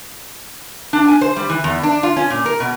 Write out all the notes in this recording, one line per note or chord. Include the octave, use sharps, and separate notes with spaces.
D4
G#5
C5
G3
E3
E2
D4
F4
C#4
A#2
A#4
B2